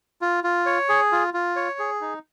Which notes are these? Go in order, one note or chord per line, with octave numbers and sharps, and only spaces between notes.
F4
F4
C#5
G#4
F4
F4
C#5
G#4
D#4